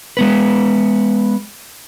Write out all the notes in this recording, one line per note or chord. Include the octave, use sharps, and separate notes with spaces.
G#3 B3 B4